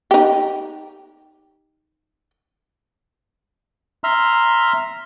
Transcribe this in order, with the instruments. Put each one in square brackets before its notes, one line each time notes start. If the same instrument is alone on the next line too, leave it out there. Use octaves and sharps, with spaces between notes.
[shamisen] D#4 G4
[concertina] E5 A#5 C6 E6 F6